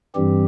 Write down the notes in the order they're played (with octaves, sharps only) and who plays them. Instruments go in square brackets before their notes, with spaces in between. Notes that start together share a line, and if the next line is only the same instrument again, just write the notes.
[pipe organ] G2 E3 G3 C4 G4